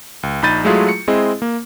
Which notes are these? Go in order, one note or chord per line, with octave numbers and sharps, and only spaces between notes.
C#2
A#1 D#4 B5 G6 A6 D#7
F#3 G#3 A3 E4 F4 G#4
C#7
G#3 C4 E4 G#4 D#5
A#3